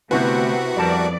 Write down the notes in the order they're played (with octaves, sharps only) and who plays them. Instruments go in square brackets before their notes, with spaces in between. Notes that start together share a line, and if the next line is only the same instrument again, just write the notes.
[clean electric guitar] D2 A3 C4 [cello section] C3 [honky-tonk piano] B3 E4 B4 [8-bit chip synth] F#4
[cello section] F2 D5 [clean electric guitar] G3 A#4 A5